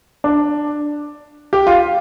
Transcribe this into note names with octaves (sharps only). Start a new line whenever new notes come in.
D4
G4
F4